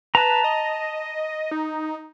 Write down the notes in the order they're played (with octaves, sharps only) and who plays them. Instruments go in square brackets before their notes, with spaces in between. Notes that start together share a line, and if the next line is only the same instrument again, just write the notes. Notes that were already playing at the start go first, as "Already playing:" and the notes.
[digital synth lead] B4 [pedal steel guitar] A5 A#5
[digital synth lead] D#5
D#4